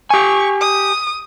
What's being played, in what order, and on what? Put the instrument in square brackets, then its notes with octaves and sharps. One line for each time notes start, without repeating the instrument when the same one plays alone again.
[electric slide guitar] G4 G#5 [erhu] C#6
[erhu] D#6